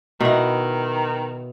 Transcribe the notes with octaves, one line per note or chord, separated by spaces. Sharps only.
B2 D#3 E4